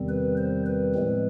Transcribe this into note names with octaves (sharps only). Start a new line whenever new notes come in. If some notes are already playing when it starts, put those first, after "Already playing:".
Already playing: E2 C3 D#3 G3 C4
B4
C5
B4
A2 F3 G#3 C4